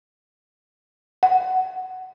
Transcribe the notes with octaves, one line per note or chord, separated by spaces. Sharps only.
F#5